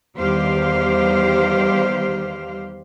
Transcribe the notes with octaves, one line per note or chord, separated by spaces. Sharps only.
E2 D#3 G3 G4 C5 F5